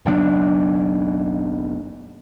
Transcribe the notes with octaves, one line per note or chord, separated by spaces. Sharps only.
F#1 B1 C4 D4